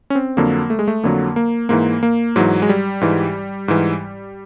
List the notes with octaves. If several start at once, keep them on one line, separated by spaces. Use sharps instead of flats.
C#4
C4
F2 D3 F#3 A#3
A3
G#3
A3
F2 D3 F#3 A#3
A#3
G#2 E3 A#3
A#3
G#2 E3 F#3
G#3
G3
G#2 E3
G#2 E3